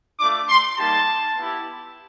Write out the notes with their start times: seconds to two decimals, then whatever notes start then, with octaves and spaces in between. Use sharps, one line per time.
0.19 A3 D4 F4 D6
0.48 C6
0.77 G3 A#3 D#4 G4 A5
1.37 B3 E4 G4